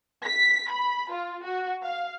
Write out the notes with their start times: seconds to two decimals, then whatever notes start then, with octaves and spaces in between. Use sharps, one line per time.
0.24 B6
0.71 B5
1.12 F4
1.44 F#4
1.85 F5